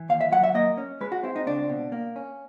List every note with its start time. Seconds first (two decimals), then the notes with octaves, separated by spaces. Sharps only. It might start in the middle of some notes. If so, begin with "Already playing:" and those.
Already playing: E3
0.09 D#2 F5
0.21 E5
0.32 F#3 F#5
0.44 E5
0.54 A#3 D#5
0.78 C#4
1.01 G#3 B4
1.12 F#4
1.23 C4 E4
1.36 D#4
1.46 C#2 D4
1.69 B2
1.92 A#3
2.16 C#4